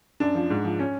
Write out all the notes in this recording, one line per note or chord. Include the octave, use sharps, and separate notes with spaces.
F#2 D4
F3
G#2
F3
C#4